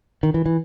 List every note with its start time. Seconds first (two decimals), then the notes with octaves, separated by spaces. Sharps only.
0.23 D#3
0.34 E3
0.46 E3